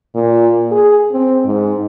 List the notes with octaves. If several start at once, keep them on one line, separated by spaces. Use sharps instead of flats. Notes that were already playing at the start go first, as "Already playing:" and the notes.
A#2
G#4
C4
G#2